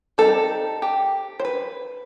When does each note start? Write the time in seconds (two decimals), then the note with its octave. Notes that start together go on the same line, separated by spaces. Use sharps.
0.18 G3 C4 D#4 A4
0.82 G4
1.40 C5
1.45 B4